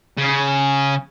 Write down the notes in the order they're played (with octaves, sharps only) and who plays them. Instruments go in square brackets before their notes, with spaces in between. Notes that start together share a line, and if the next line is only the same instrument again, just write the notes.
[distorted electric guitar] C#3